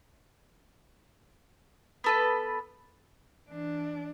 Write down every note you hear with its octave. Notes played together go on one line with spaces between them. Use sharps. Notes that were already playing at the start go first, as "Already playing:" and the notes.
B3 A4 B4
E3 D4